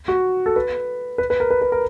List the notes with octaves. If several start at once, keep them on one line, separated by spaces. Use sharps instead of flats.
F#4
A4
B4
B4
B4
A#4
B4
B4
A#4